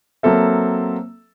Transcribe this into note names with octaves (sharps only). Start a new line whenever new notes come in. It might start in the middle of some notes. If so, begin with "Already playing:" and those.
F#3 A#3 C4 A4 E5